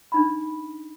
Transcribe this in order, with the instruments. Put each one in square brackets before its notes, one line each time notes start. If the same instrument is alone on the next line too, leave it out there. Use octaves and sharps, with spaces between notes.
[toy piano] D4 D#4 B5